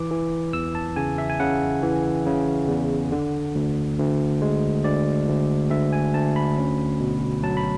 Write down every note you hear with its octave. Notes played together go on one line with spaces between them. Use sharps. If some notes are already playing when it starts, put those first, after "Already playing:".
Already playing: E3 D6
E3
E2 E6
A5
C#3 G#5
E5
G#5
C#3 F#5
E3
C#3
E2
D3
D2
D2
G#3
D2 D5
D2
D2 E5
G#5
D2 A5
B5
C#4
B2
F#3 A5
B5